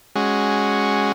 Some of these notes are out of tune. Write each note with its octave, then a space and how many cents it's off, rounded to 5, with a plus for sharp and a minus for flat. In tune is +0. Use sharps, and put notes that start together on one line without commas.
G#3 +0 C#4 +0 F#4 +0